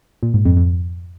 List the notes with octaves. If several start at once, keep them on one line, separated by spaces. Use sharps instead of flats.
A#2
G#2
F2
F2